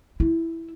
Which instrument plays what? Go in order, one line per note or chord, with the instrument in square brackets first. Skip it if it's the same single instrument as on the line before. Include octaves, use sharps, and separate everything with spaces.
[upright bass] E4